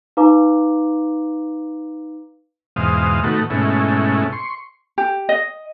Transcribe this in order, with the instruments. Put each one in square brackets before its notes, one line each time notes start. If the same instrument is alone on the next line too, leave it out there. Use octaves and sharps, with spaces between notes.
[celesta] D#4 B4 F5 A#5 D6
[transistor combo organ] E2 G#2 B2 C5 F5 D#6
A2 D#3 A3 B3 F#4
G#2 B2 A3 C#4 E4
C6 C#6
[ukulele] G4
D#5